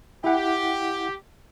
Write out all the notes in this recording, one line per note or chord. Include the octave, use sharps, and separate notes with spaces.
E4 G4 F#5